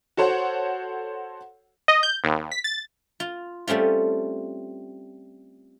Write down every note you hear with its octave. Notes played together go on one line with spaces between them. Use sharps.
F#4 A4 C5 C#5 F#5
D#5
G6
D#2
B6
A6
F4
G3 A3 C4 C#4 F4